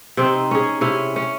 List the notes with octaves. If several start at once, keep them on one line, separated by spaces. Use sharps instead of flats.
C3 C4 D#4
C#4 G#4
C3 C#4 E4
C#4